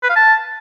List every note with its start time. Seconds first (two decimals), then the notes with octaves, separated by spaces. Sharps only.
0.03 B4
0.09 F5
0.16 A5